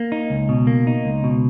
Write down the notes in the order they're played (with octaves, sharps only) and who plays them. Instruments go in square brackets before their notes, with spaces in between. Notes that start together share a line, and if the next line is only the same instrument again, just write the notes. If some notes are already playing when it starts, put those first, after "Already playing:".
Already playing: [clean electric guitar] A#3
D#4
C#2
B2
A#3
D#4
C#2
B2